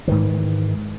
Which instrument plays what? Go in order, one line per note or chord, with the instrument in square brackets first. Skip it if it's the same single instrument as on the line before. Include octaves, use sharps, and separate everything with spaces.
[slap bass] G#2 D#3 E3